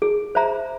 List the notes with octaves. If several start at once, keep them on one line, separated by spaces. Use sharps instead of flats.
G#4
C5 E5 A#5